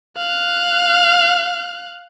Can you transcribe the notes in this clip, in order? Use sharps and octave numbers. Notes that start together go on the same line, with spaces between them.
F5 F#6